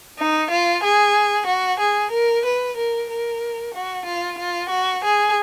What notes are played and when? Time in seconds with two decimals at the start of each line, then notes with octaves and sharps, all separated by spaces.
0.18 D#4
0.51 F4
0.83 G#4
1.48 F#4
1.81 G#4
2.12 A#4
2.45 B4
2.77 A#4
3.10 A#4
3.74 F#4
4.06 F4
4.39 F4
4.70 F#4
5.03 G#4